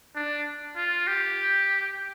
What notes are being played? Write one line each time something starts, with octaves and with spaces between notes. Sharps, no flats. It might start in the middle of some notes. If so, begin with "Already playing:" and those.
D4
F4
G4